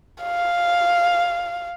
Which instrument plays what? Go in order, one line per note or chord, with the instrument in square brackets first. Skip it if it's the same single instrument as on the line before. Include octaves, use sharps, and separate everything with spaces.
[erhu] F5